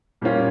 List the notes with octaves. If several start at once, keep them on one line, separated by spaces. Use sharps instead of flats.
A#2 G3 A#3 C#4 F4